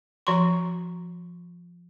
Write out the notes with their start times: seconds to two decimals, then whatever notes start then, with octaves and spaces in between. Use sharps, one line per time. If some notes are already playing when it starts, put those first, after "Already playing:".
0.27 F3 F#4 A#5 C6 C#6